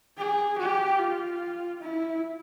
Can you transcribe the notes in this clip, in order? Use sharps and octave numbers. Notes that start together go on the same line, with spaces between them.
G#4
G4
F4
E4